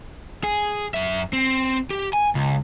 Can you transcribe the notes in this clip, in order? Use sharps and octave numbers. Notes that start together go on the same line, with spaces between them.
G#4
F#2 E5
C4
G4
G#5
C#2